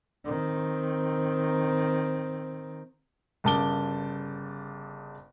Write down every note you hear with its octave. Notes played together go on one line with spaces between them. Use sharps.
D#3 C4
G1 C#3 A#4 A5 D6 G7